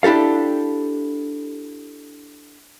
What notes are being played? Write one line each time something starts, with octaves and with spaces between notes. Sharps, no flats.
D4 E4 G4 A4 F5